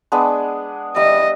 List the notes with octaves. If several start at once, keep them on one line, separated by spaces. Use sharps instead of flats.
G#3 B3 D4
G3 D#5 E5